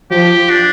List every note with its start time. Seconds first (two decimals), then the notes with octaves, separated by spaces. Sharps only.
0.11 F3 G4
0.50 D4